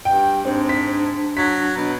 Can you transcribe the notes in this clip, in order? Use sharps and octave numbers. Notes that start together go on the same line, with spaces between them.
G2 G5
G#2 C4 D4
B6
F#3 B6
B2 D4